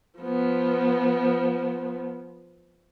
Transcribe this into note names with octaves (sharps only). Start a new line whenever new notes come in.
F3 B3